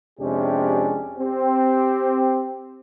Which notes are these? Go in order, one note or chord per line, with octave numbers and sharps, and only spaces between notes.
F2 C3 G#3 C#4 D4 G4
C4 G4